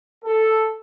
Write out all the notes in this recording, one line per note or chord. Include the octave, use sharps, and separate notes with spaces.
A4